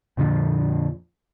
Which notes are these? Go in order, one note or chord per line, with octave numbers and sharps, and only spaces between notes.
F2 A#2 D3 F3